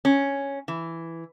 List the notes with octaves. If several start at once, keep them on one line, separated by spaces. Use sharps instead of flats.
C#4
E3